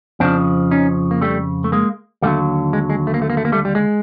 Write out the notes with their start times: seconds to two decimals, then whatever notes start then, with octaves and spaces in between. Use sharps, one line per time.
0.20 F2 C#3 F3 C4 D4
0.71 C#4 D#4
1.11 A#3
1.21 G3 A3
1.64 A3
1.72 G#3 A#3
2.22 D#2 D3 F#3 G3 A3
2.73 G#3
2.90 G#3
3.07 A3
3.14 A#3
3.22 A3
3.30 A#3
3.37 A3
3.45 A#3
3.52 G3 A3
3.65 G3
3.75 G#3